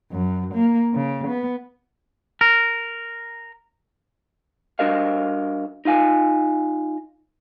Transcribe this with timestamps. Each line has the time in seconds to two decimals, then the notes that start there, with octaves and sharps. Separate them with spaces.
0.12 F#2
0.54 A#3
0.94 C#3
1.28 B3
2.41 A#4
4.79 G3 D4 F#4 A#4 D#5 F5
5.85 D#4 F4 F5 G#5